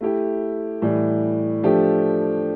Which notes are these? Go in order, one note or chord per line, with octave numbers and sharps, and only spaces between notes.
A3 E4 G4
A2 E3 G3
F3 A3 D4 G4